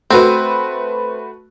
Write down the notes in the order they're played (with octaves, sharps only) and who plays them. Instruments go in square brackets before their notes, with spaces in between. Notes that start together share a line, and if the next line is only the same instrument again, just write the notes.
[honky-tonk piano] A3 F#4 B4 [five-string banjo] C4